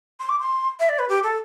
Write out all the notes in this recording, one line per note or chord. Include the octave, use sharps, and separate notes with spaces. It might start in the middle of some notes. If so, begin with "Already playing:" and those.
C6
D6
C6
E5
D5
B4
G4
A4